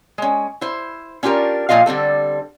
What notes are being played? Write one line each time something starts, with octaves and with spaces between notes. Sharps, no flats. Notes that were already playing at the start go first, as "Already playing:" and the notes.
G#3 C#4
E4 C5
C#4 D4 F4 G4 A#4
A#2 F3 F4 D#5 F5
D3 G3 C4 A4